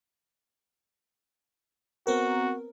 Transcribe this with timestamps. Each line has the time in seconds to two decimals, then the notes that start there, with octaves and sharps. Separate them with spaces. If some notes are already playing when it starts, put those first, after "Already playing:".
2.07 B3 C4 F#4 A#4